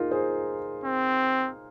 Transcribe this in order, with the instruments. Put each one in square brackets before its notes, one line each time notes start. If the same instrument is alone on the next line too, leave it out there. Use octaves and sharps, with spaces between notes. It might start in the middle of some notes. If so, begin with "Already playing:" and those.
Already playing: [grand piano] D#4 F4 G#4 A#4
G#4 C5
[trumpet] C4